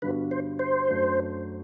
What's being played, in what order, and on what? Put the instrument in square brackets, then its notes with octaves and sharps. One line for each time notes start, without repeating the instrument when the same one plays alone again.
[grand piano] G2 D3 G3 B3 F#4 [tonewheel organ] B4
[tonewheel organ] C5
C5
[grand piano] F#2 F#3 A3 D4